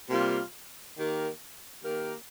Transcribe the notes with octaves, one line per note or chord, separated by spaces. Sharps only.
C3 G3 A#3 F4
D#3 A#3 G4 A#4
D#3 A#3 G4 A#4